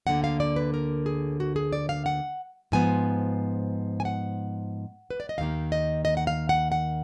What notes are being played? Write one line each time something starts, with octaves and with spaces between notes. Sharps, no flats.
D2 D3 F#3 A#3 F#5
F5
D5
B4
A#4
G#4
F#4
G#4
D5
F5
F#5
G#2 F3 B3 G#5
G#5
F#5
B4
D5
D#5
D#2 D#3 A#3 F5
D#5
D#5
F#5
F5
F#5
F#5